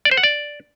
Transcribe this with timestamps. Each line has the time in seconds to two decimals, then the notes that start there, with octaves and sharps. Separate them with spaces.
0.05 D5
0.11 C5
0.17 F#5
0.23 D5